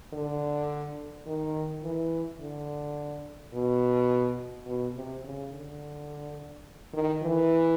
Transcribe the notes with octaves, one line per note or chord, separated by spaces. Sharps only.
D3
D#3
E3
D3
B2
B2
C3
C#3
D3
D#3
E3